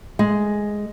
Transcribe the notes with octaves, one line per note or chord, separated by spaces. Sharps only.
G#3